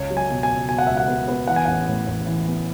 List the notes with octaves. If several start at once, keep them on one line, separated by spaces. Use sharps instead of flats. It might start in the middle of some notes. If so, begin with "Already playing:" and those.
Already playing: C#2 C#5
F#3
G#5
B2
G#5
C#2
B2 G#5
F#5
C#2 E5
F#5
B3
B3
E3 F#5
G#5
A1 F#5
A2
A1
E3
B3